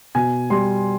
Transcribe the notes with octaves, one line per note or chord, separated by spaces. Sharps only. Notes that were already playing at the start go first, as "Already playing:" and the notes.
B2 G#5
G3 C6